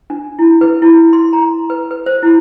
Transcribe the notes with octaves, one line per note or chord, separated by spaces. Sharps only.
D4
E4
B4
E4
C6
A#5
B4
B4
C5
E4